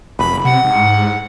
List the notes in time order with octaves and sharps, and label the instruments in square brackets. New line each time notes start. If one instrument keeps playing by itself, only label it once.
[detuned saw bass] F1 [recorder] B5
[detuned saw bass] F#1
[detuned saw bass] C3 [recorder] F#5
[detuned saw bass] G#2